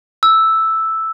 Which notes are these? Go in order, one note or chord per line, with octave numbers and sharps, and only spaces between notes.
E6